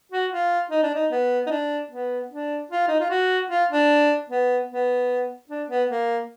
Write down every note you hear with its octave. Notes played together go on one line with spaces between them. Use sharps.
F#4
F4
D#4
D4
D#4
B3
D#4
D4
B3
D4
F4
D#4
F4
F#4
F4
D4
B3
B3
D4
B3
A#3